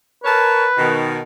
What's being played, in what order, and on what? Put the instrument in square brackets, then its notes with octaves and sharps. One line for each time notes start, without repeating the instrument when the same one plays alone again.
[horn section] A#4 C#5 A5 [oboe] B4
[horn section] B2 D#3